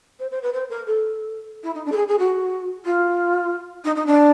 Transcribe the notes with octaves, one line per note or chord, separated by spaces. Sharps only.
C5
C5
B4
C5
A#4
A4
E4
D#4
D4
A4
G#4
G#4
F#4
F4
D#4
D#4
D4